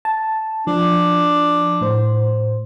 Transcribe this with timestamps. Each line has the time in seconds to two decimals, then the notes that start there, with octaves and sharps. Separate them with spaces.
0.05 A5
0.67 F3 D4
1.81 A2 C5